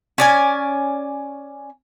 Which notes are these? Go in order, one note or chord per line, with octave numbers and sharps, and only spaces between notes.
C#4 D5 G#5